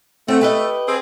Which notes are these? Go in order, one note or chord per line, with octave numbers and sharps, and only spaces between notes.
A3 C4 F#5
G4 B4 D#5
C4 G#4